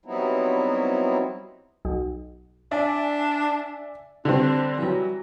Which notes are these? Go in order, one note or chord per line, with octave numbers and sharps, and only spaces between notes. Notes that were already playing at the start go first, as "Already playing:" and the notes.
F#3 G3 B3 C4 D#4 E4
B1
D4 D5 E5 G#5
D3 G3 C4 D4
E3 F#3 G3